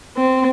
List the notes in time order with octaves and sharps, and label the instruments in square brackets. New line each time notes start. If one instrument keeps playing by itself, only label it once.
[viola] C4